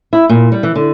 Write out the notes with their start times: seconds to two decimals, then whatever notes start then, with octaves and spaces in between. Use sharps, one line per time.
0.13 E4
0.29 A#2
0.52 G3
0.63 E3
0.76 D3